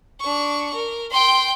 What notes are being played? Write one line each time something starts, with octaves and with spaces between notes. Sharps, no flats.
D4 C#6
A#4
G5 C6